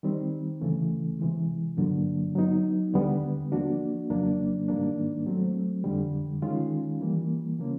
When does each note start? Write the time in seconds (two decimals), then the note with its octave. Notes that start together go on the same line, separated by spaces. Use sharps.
0.03 D#3 G3 C4
0.61 D2 C#3 E3 A3
1.19 C3 E3 G#3
1.77 G2 D3 F#3 A#3 D4
2.35 F#3 B3 D#4
2.94 D#2 D3 G3 B3
3.52 F3 A#3 D4 F#4
4.10 F2 C#3 F#3 A#3 D4
4.68 G#2 D#3 G3 A#3 D4
5.26 F#3 A3 C4
5.84 F2 D3 G3
6.42 D#3 G#3 C#4 F4
7.01 E3 G3 A#3
7.59 C#3 F3 A#3 C#4